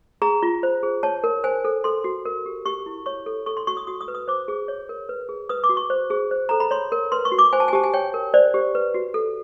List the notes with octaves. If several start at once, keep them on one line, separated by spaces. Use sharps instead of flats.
G#4 A#5
F4
C5
G#4
C#5 A5
A#4
C5 G#5
A4
A4 C6
F#4
A#4
G4
G4 C#6
E4
C#5 C#6
A4
A4 C#6
C6
F#4 C#6
D#6
F#4 D#6
D#6
B4
D#6
C5 D6
G#4
C#5
A#4
B4
G#4
B4 D#6
D6
F#4
C#6
C5
G#4
C5
A4 A#5
B5
C#5 C6
A#4
B4 C6
C#6
F#4
D6
C5 G#5
A5
G#5
G4 A5
G#5
C#5 G5
A#4
C5 D5
G4
B4
F#4
A4